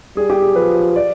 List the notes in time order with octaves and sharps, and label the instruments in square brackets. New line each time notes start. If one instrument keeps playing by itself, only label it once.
[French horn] G3 [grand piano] G#4
[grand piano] G4
G#4
[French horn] F3 [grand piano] B4
[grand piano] D5